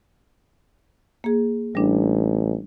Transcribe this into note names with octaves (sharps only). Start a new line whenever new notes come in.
A#3 G#4
A1 G3 D4